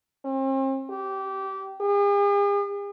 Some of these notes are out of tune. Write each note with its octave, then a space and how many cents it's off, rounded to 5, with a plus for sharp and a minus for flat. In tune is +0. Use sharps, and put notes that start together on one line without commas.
C4 +40
G4 -20
G#4 -45